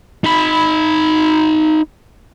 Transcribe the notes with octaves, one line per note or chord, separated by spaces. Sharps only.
D#4 B5